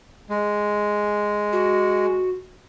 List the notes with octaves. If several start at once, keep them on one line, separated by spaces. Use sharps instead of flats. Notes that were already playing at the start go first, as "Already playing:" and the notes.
G#3
F#4